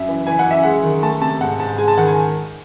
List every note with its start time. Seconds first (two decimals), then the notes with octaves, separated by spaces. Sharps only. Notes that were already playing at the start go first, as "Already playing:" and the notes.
Already playing: F#2 E5
0.08 E3
0.27 E3 G#5
0.39 F#5
0.47 F#2 E5
0.63 G#3 F#5
0.83 D#3
1.03 A3 A5
1.21 C3 A5
1.40 G#2 F#5
1.60 G#2 A5
1.78 G#3 G#5
1.88 A5
1.97 D#3 F#5
2.07 G#5